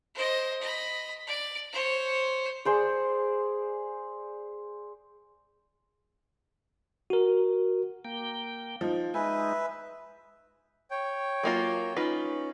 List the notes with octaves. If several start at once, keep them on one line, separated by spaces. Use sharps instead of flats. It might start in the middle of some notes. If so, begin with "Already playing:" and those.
C5 D#5
D#5 B5
D5
C5 C#5
G#4 C5 D5
F#4 A#4
A#3 G5
F3 D#4
G#3 D#4 B4 E5 G#5
C#5 G5
F#3 A#3 F4
C#4 D#4 F4 B4